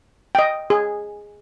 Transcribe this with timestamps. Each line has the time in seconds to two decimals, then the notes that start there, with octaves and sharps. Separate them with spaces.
0.35 D#5 G5
0.70 G#4